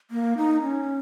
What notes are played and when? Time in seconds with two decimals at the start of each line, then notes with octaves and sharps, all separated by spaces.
0.11 A#3
0.37 D#4
0.62 C#4